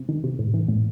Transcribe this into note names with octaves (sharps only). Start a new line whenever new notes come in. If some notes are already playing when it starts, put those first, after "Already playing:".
Already playing: C3
D#3
C3
A2
E3
A2